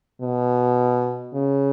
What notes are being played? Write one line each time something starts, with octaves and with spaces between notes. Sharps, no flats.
B2
C#3